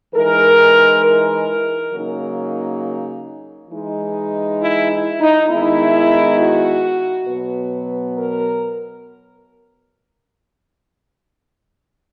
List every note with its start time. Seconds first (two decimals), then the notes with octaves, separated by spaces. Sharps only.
0.15 E3 G#3 D#4 A#4
1.03 A#4
1.92 C#3 F#3 A#3 D#4
3.70 E3 G#3 D#4
4.59 E4
4.90 E4
5.20 D#4
5.49 D#3 G#3 B3 D#4 E4
6.38 F#4
7.26 B2 F#3 B3 B4
8.16 A#4